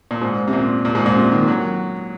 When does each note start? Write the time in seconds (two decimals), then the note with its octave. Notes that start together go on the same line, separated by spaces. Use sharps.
0.11 A#2
0.21 G#2
0.48 C3
0.53 A#2
0.85 A#2
0.95 G#2
1.06 A#2
1.16 C3
1.32 D#3
1.48 F#3